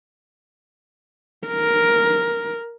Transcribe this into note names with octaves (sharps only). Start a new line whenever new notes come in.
A#4